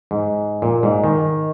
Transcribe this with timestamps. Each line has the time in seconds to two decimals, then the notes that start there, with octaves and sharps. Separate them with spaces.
0.11 G#2
0.62 A#2
0.83 G#2
1.04 D#3